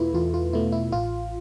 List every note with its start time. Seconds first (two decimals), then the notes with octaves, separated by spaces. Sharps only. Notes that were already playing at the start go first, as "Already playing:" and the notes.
Already playing: E2 B2 A3 E4 F4 B4
0.13 E2 F4
0.34 F4
0.53 B2 A3 E4
0.72 E4
0.92 A1 F4